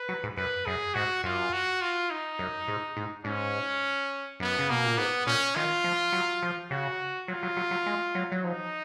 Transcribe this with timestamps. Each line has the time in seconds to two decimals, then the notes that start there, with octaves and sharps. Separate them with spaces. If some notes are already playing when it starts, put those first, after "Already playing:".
Already playing: B4
0.09 F#3
0.24 G#2
0.37 F#2 B4
0.66 F#2 G#4
0.94 G#2 F#4
1.23 F#2 F4
1.53 F#4
1.81 F4
2.11 D#4
2.39 F#2
2.68 G#2
2.97 G#2
3.25 G#2 C#4
4.40 F#2 B3
4.59 C#3
4.69 B2 A#3
4.85 A#2
4.97 G#2 B3
5.26 A#2 C#4
5.56 D#3 F4
5.84 F3
6.13 F#3
6.43 F3
6.71 C#3 F#4
7.28 F#3 F4
7.43 F#3
7.57 F#3
7.71 F#3
7.86 G#3
8.15 F#3
8.32 F#3
8.44 F3 D#4